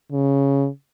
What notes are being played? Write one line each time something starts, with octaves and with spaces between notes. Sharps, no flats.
C#3